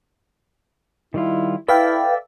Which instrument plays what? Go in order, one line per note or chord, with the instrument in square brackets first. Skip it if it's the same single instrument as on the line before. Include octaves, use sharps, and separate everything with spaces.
[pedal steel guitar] D#3 G3 F4 [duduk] E4
[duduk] E4 [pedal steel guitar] A4 D5 E5 [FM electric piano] B4 F5 G5